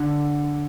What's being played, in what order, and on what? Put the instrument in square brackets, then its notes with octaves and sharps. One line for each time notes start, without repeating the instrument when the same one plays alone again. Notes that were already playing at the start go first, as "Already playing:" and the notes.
Already playing: [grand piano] D3